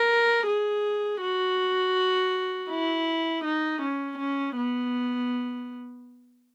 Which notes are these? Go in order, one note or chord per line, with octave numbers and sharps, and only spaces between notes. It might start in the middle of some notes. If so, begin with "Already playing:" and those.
Already playing: A#4
G#4
F#4
E4
D#4
C#4
C#4
B3